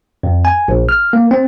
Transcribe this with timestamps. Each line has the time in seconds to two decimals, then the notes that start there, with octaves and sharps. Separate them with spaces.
0.23 F2
0.45 G#5
0.68 A#1
0.89 F6
1.13 A#3
1.31 C4